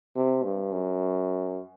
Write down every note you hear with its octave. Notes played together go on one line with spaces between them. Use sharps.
C3
G2
F#2